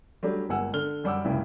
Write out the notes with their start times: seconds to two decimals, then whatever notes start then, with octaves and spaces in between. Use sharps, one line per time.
0.23 F#3 G3 A3 D4 G4
0.49 G1 G#3 A#3 F#5 G#5 E6
0.73 D3 F6 G7
1.04 F#2 G3 F#5 D6 E6
1.25 F1 C2 C#3 E4 D5 G5